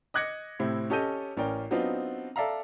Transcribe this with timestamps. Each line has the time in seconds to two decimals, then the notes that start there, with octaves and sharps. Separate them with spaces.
0.14 D#5 D6 F#6 G#6 A#6 C#7
0.60 A2 C3 C4 E4
0.90 C#4 G4 A4 D#5 G6 D#7
1.37 A1 C#4 A#4 D5 G5
1.71 F#3 B3 C4 D4 D#4 F4
2.36 A4 D5 E5 F5 A#5